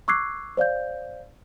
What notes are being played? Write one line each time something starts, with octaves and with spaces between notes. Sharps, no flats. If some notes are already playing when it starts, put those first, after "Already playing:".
C#6 D6 E6 F#6 G#6 C7
C5 D5 F5 G6